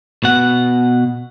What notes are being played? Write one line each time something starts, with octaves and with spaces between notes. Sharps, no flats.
B2 F#5